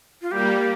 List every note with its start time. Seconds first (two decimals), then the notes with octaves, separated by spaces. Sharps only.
0.22 F4
0.31 G3 A#3 G4